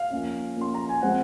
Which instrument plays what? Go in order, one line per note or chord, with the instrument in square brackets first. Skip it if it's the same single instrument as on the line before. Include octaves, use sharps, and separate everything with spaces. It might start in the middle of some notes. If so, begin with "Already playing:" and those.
Already playing: [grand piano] F5
F3 A#3 C#4
F3 A#3 C#4 C6
A#5
G#5
F3 G#3 C4 F#5